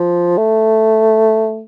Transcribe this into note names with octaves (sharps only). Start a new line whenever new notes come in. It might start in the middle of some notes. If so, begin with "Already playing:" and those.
Already playing: F3
A3